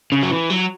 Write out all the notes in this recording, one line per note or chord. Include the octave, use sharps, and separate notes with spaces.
C#3
F#3
E3
F#3